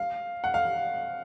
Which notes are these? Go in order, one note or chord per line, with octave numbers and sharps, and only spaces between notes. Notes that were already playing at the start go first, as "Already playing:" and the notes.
Already playing: F5
F#5
F5